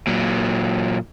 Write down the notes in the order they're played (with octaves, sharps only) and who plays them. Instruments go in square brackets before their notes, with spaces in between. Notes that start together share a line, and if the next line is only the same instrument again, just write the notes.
[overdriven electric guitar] A#2 F#3